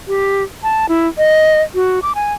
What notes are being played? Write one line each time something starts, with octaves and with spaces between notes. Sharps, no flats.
G4
A5
E4
D#5
F#4
D6
G#5